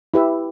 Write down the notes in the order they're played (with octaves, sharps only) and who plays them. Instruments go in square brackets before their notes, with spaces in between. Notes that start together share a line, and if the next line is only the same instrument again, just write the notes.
[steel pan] E4 G4 B4 E5